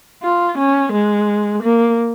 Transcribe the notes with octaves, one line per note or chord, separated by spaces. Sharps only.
F4
C#4
G#3
A#3